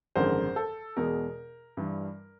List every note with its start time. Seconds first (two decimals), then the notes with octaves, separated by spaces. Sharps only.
0.16 G#1 F#2 D3 F3 G#3 A#4 C5
0.56 A4
0.97 E2 B2 G#3 A#4
1.77 G2 E3 G3